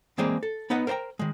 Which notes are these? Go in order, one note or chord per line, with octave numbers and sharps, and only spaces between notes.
E3 G#3 A#3 C4 G#4 D5
A4
B3 D#4 B4 D#5 F#5
A#4 C5 D#5 G5 A#5
D#3 G#3